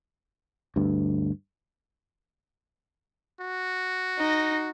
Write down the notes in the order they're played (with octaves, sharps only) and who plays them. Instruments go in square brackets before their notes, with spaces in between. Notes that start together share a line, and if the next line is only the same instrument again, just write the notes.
[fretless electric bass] D2 G2
[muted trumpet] F#4
[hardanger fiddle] D#4